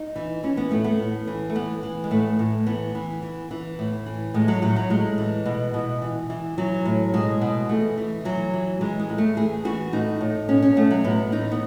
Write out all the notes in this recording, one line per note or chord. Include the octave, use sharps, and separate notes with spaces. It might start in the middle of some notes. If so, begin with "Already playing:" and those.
Already playing: D#4
E3
E3 C#4
B3
A2 A3
B3
A2
E3
A3
E3 B3
E3
G#3
A2 A3
A2
E3 B3
E3
E3
E3
A2
E3
A2 G#3
F#3
A2 F#3
F#3
A2 G#3
E3
B2
B2
E3
E3
E3 F#3
A2
B2 G#3
B2
E3 A3
E3
E3 F#3
E3
E3 G#3
G#3
A2
A3
E3 G#4
E3 F#4
A2 D#4
A2
B2 C#4
C#4
B2 A3
F#3
A2 B3
E3 D#4
B3